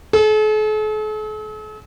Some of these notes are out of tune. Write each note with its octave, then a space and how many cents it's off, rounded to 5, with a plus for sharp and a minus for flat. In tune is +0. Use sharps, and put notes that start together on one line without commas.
A4 -45